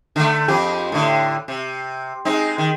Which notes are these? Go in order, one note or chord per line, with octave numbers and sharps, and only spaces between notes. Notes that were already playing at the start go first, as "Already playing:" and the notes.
D3 A3
F2 F3 G4
A2 D3
C3
G#3 C4 D#4
D#3